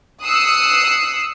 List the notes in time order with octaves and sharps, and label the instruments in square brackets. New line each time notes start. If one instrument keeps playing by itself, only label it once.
[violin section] D#6 E6 F#6 C7 C#7